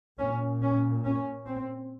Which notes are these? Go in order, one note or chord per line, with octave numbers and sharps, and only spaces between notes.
A#2 C#4
C#4
C#4
C4